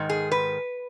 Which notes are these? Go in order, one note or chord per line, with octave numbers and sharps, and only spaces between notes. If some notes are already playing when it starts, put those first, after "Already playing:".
Already playing: G#2 D#3
G#4
B4